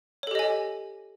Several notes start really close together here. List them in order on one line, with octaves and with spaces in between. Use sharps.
C#5 A4 G4 D#5 G#5